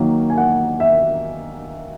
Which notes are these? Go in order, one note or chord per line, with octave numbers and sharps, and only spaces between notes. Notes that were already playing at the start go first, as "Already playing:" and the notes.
Already playing: D#3 F#3 A#3
G#5
F#5
E5